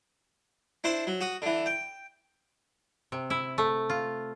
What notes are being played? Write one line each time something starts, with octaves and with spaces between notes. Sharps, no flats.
D4 E4 C5 C6
F#3
F#4 D#6
D3 E3
G5
C3
E4
A3
F4